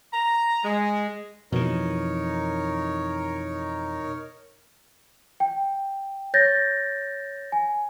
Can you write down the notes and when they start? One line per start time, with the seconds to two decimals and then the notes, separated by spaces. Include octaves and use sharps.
0.14 A#5
0.64 G#3
1.52 F2 B2 E3 D#4 A#4 C#5
5.40 G5
6.34 C#5 G6 A6 A#6
7.52 G#5